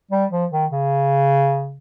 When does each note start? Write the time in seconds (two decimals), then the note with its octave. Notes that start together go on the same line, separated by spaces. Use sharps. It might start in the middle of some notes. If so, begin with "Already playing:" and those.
0.11 G3
0.31 F3
0.52 D#3
0.71 C#3